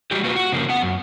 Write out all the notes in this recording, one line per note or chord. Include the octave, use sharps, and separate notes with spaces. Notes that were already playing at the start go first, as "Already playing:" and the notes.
G3 G#3 F#4 G4
A#3 F4 F#4 B4
F#4
C#3 F3 A#3
B3 F#5
F#2